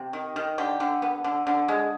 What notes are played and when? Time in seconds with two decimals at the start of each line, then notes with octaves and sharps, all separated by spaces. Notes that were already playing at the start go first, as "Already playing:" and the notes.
Already playing: C3
0.13 D#3
0.36 D#3
0.58 D3 G4
0.80 D3
1.02 B3
1.24 D3
1.47 D3
1.68 G#3